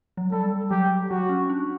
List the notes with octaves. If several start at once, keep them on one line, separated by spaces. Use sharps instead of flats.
F#3
G3 A4
F#3 G4
F#3 F#4
C#4
D4